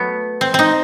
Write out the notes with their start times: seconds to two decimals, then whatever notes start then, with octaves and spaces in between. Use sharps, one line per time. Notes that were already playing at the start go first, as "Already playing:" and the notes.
Already playing: F#3 A3 B3
0.41 C4
0.54 C4 D#4